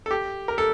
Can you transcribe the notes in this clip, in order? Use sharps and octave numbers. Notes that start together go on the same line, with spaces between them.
A4
G4
A#4
A4